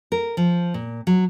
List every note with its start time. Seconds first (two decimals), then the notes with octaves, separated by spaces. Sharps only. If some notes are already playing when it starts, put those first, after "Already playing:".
0.12 A#4
0.37 F3
0.74 A#2
1.07 F#3